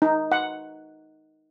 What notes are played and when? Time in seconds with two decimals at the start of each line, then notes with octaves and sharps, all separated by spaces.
0.02 D#4
0.32 F#5